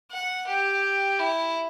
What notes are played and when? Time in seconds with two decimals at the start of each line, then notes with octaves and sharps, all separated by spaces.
0.11 F#5
0.47 G4
1.19 E4